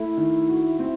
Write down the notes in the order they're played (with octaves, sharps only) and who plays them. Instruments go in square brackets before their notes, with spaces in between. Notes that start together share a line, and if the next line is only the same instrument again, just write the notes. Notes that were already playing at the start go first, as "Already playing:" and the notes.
Already playing: [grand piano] A3 [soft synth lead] E4
[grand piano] D#3
F#4
C4